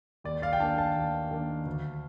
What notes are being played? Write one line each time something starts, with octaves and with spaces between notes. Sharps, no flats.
D#2 D5
D5 F5
G5
D#3 A#3 D4 F5 A5
F5 A5
D#2
D#3 A#3 D4
D2